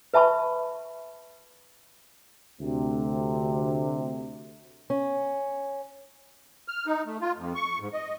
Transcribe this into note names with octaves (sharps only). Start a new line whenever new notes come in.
B4 E5 A5 B5 C#6
D2 C3
C#4
F6
D#4
A3
F4
F2
C#6
G#2
D#5